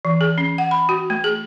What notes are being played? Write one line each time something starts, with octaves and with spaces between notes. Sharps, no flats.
E3
G#4
C#4
F#5
B5
F#4
A3
G#4